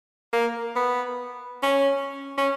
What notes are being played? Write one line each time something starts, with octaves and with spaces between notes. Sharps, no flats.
A#3
B3
C#4
C#4